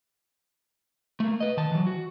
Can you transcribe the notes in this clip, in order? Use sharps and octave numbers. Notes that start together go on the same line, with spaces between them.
A3 A#3
B4 D#5
D#3 A5
E3 F#3
F#4